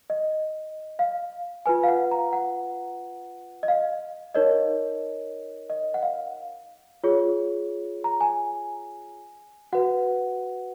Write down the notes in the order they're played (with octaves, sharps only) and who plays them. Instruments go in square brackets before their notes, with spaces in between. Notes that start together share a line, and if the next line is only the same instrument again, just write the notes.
[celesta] D#5
F5
F4 B4 G#5
F5
F#5
A#5
F#5
D#5
F5
D#4 A#4 C#5 D#5
D#5
F#5
F5
F4 G#4 C#5
A#5
G#5
F#4 B4 F#5